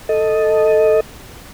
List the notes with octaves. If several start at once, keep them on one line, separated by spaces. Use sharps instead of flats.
A4 D#5